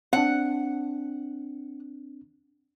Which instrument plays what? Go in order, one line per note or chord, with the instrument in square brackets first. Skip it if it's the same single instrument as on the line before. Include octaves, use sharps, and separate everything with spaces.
[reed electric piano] C4 D4 [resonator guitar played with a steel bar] F#5